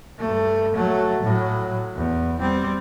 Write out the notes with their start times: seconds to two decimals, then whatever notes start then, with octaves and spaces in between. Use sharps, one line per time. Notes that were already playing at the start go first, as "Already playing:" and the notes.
0.19 G2 A3
0.75 F#3 A3
1.23 A2 F#3
1.95 E2
2.39 G3 C4